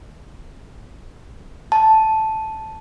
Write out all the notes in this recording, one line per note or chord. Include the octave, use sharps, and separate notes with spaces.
A5